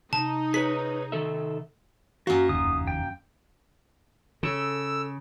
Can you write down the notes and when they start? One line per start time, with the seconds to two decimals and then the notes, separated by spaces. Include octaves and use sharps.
0.13 C3 D#4 A5
0.54 G#4 B4 C#5 B6
1.12 D#3 A4 E5
2.27 F#2 A#3 F#4
2.49 F1 D#2 D#3 D#6
2.87 G5
4.43 C#3 A4 E6